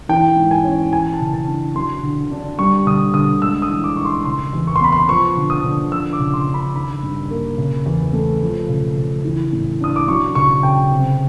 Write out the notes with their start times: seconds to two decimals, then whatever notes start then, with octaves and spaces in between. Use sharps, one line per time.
0.09 E3 G5
0.36 G#2
0.51 G#5
0.64 C#4
0.92 E3 G#5
1.13 A5
1.20 C#3
1.33 A5
1.47 D4
1.75 F#3 C6
2.03 D3
2.31 D4
2.59 G3 C#6
2.86 D3 D#6
3.14 D3 D#6
3.42 G#3 E6
3.62 D#6
3.69 E3
3.84 D6
3.97 D#4 C#6
4.05 C6
4.25 C#3 C6
4.53 E2
4.67 C#6
4.76 C6
4.81 B3 B5
4.92 C6
5.08 F3 C#6
5.37 D3
5.50 D#6
5.64 D3
5.92 F3 E6
6.13 D6
6.19 C#3
6.34 C6
6.48 D4
6.54 B5
6.75 D#3 B5
7.03 G2
7.31 A#3
7.58 C#3
7.86 E2
8.13 A3
8.42 F3
8.69 C#3
8.97 C#3
9.25 E3
9.52 A2
9.81 D4 D#6
9.96 D6
10.08 F#3 C#6
10.35 C#3 C#6
10.63 C#3 G5
10.91 C3